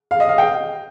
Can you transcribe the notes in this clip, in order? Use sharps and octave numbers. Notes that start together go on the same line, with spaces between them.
F5
D#5
F5
G5